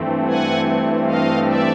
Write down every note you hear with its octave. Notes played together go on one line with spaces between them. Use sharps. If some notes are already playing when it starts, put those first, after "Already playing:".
Already playing: G2 E3 A3 C4
F#5 G#5
D#5 F5
D5 E5